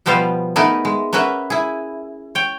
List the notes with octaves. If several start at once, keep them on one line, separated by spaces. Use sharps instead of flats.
B2 F3 G3 B3 C5 F5
A3 B3 D#4 G#4 A#4 B4
G#3
A#3 C#4 F#4 B4 E5
E4 G#4
C#5 G5